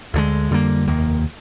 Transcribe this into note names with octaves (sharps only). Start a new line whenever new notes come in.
D2 D3 F3 G#3
F2 D3 G3 A#3
F1 D#2 D#3 A#3